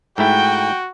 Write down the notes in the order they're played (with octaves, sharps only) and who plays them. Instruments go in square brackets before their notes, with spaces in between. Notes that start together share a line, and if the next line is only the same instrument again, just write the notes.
[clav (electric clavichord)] G#2 A3 E4 [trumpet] F#4 [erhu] G5